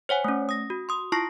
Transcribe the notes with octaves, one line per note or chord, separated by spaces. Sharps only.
C5 C#5 F#5 G#5
A3 C#4
D#6 A#6
F#4
C6 D#6
E4 F4 A5 C#6 A#6 C7